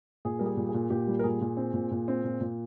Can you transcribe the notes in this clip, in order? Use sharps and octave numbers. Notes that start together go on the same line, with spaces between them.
A#2 G#4
G3 A#4
G#4
A#2
G#4
A#2
A#2 G4
G3
A#4
A#2 G#4
A#2
C4
A#2
A#2
C4
A#2
A#2